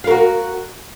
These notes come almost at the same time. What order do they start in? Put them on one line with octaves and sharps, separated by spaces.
F5 A#4 F#4